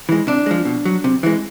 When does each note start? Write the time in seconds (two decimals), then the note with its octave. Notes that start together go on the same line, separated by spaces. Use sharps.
0.09 E3 G#3
0.27 C3 D4
0.46 F3 G#3
0.65 B2
0.85 F#3
1.04 C3
1.23 E3 G#3